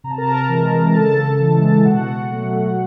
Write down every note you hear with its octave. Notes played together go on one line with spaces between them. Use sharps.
C3 A#5
A5
A#4 A#5
E3 G#3
C#3 A4 A5
E3 G#3
B2 F#4 F#5
F#3 A3